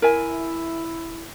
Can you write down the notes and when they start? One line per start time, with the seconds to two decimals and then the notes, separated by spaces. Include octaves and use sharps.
0.02 E4 A#4 E5 G#5